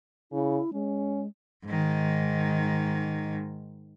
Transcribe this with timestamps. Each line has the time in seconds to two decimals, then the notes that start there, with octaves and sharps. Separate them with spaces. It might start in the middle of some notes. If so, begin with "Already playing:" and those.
0.32 C#3 E4
0.73 G#3 C#4
1.65 G#2 D#3